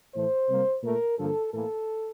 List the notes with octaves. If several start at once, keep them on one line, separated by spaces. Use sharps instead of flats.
A2 E3 A3 C5
C3 G3 A#3
A#2 A3 A#4
G2 D3 F3 A#3 A4
A2 E3 A#3 A4